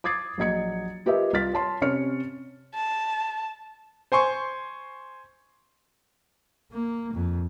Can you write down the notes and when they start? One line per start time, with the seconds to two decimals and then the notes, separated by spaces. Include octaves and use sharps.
0.04 D6 D#6 G#6 A6 C7
0.38 A#1 F#3 D#5 G#6 C#7
1.06 F4 G4 A#4 B4 D#5 E5
1.33 C2 F4 F6 A6 B6
1.54 C#5 A5 C6
1.81 C3 C#4 C#5 F6 C#7
2.74 A5
4.12 C5 G#5 C6 C#6
6.71 A#3
7.13 F2